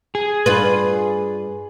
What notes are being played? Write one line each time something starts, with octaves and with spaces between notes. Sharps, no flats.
G#4
G2 F4 B4